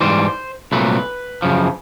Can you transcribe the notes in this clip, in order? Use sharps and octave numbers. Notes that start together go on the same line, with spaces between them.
G#2 E3 G3 C5
C2 A#2 F#3 A3 B4
F#2 C#3 F3